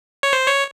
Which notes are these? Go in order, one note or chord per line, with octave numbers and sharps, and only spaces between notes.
C#5
C5
C#5